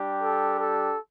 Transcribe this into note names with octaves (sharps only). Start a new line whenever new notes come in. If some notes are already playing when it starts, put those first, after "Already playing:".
Already playing: G3 D4 G4
A4
A4